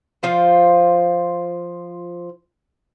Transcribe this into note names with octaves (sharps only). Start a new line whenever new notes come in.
F3 F4 C5